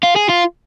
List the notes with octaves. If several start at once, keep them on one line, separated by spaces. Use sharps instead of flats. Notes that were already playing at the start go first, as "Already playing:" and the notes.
F4
G#4
F4